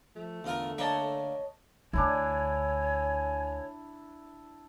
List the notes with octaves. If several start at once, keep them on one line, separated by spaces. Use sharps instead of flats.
F3 A3
E2 D3 F4 A#4
A#3 D4 C#5 D#5 A5
D2 D3 D4 E4 C#5 G#5